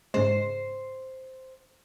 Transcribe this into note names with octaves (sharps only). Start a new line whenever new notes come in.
G#2 C#3 G#3 C5